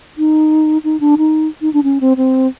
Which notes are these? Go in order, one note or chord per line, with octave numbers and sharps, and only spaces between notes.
D#4
D#4
D4
D#4
D#4
D4
C#4
C4
C4